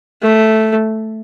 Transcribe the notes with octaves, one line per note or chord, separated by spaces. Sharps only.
A3